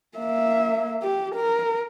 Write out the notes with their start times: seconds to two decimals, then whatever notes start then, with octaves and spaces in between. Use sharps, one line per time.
0.17 A#3 E5
1.02 G4
1.35 A#4